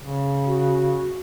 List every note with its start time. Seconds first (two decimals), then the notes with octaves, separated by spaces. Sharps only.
0.01 C#3
0.46 F#4